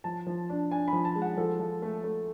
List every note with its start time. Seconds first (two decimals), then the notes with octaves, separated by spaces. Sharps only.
0.04 F3 A5
0.27 F3
0.50 D4
0.71 D4 G#5
0.88 B5
0.93 F3
1.05 A5
1.15 G#3
1.22 F#5
1.37 F3 A4
1.60 F3
1.82 A3
2.04 A3